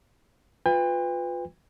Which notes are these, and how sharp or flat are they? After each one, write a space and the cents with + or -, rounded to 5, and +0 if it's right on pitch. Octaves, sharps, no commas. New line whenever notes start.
F4 +20 B4 +15 G5 +40